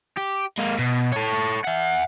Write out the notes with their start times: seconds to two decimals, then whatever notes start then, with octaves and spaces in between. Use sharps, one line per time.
0.17 G4
0.58 G#3 A#3
0.79 B2
1.13 A4 C#5
1.65 E5 F#5